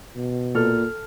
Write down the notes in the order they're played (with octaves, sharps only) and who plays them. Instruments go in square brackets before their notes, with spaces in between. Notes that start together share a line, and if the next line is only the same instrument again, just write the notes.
[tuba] B2
[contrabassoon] A#2 [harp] A4 F6